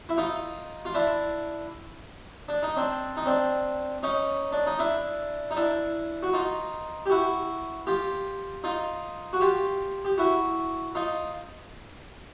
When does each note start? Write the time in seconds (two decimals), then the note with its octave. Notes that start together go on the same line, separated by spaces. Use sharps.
0.09 E4
0.18 D#4 F4
0.85 F4
0.94 D4 E4
2.48 D4
2.63 D#4
2.76 C4 D4
3.17 D#4
3.26 C4 D4
4.03 C#4 D#4
4.52 D4
4.67 D#4
4.79 D4 E4
5.51 D#4
5.56 D4 E4
6.23 F#4
6.33 D#4 F4
7.06 G4
7.10 E4 F#4
7.87 F4 G4
8.64 D#4 F4
9.33 F#4
9.41 F4 G4
10.05 G4
10.18 E4 F#4
10.95 D#4 F4